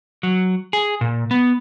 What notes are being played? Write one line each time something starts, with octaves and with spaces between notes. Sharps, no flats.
F#3
G#4
A#2
B3